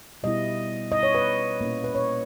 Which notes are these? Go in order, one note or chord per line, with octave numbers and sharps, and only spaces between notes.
B2 G3 B3 E4 D#5
D#5
C#5
B4
A#2 A#3 C#4 E4
B4
C#5